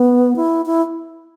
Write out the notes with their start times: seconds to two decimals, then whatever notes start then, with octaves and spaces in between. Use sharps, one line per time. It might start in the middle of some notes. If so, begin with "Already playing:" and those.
Already playing: B3
0.36 E4
0.66 E4